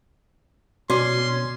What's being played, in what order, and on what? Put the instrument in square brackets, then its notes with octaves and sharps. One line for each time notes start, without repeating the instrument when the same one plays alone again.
[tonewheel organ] B2 [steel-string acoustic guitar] C#4 [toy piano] F#4 D5 D6 [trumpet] C6